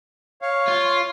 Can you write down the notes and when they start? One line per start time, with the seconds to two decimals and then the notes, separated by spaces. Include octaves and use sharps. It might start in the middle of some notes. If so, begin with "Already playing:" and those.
0.42 C#5 F5
0.68 F4